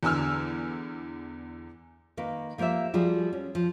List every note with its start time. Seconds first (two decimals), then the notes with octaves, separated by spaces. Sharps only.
0.03 E2 D3 G#5 E6 F6
2.17 D#3 A#3 B4
2.58 F3 A#3 G4 C5 E5
2.94 F3 G3 F#4 G#4
3.33 C#4
3.55 F3